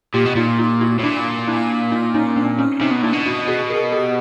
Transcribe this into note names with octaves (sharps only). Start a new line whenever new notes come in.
A#2 F4 G4
B2
A#2 D#4 F4
D#4 F4
E4 F#4
A2
A#2 D4 E4
D4 E4
D#4 F4
C#4 D#4
C4 D4
C#4 D#4
C3 C#4 D#4
B2
A#2 D4 E4
B2
E4 F#4
F#4 G#4
G#4 A#4
G4 A4